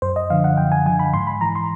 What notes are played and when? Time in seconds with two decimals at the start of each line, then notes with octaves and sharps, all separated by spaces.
0.02 F#2 C5
0.16 D#5
0.30 D3 F3 F5
0.44 F#5
0.57 F#2 G5
0.72 G#5
0.86 D3 F3 G#5
0.99 B5
1.13 G#2 C6
1.27 B5
1.41 E3 A#5
1.55 C6